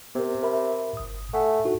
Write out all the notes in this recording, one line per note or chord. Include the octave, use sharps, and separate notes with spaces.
C3 B3 A#4
A#4 E5 B5
G1 D#6
A3 F#5 G#5
D#4 F#4 A4